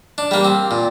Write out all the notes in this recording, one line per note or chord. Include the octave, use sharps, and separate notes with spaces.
D4
G3 A#3
C4
A#2